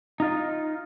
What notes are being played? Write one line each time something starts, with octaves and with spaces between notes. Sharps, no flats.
D#4 F4